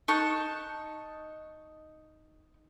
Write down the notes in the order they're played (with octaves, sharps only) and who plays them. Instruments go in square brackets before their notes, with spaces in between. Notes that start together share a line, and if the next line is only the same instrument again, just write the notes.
[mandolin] D#4 A5 C#6 F#6